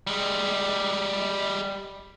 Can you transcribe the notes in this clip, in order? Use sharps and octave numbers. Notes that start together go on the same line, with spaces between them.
G3 G#3